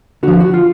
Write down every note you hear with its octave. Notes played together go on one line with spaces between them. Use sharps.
D3 F3 F#4
F#4
F4